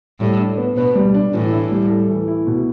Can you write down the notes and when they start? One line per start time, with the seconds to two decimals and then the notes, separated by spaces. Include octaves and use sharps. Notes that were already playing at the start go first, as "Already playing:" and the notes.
0.20 A2 G3
0.39 D4
0.58 B3
0.77 B2 B4
0.95 G3
1.14 D4
1.34 A2 E3
1.53 E4
1.72 G3
1.90 A4
2.09 E3
2.28 E4
2.47 B2